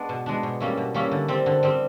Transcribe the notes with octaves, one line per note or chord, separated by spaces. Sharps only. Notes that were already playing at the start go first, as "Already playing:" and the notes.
Already playing: G#3 B3 D4
B2
G#3 B3 D4
B2
G3 A#3 C#4 E4
B2
G3 A#3 C#4 E4
D3
G3 C4
D3
G3 C4